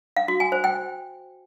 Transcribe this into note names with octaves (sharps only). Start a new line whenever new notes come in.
F5
F#4
G#5
C5
G5